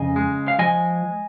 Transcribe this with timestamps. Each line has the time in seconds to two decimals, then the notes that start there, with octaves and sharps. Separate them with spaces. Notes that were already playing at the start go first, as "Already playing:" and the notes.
Already playing: F2 C#3 D#5 G#5
0.16 G#3
0.48 F5
0.59 F3 D#5 G#5